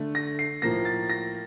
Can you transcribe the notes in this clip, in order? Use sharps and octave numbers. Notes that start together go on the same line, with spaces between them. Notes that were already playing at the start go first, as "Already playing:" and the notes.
Already playing: D3 A3
A#6
C7
A2 F3 A#3 A#6
A6
A#6